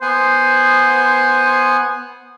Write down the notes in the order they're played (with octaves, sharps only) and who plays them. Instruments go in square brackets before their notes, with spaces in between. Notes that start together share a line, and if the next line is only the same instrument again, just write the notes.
[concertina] B3 F#5 G#5 [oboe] C5